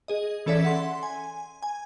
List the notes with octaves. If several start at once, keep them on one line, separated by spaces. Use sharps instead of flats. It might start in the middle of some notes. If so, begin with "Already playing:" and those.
G#4 D#5
E3 C#4 A4 D5 E5 B6
F#5 C6
G#5
G#5